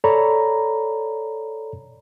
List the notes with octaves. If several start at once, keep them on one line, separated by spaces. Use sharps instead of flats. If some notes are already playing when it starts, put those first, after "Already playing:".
A4 C#5 D5 A#5 B5